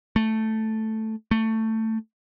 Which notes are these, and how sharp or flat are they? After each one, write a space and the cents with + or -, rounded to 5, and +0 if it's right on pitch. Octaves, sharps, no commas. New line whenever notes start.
A3 +0
A3 +15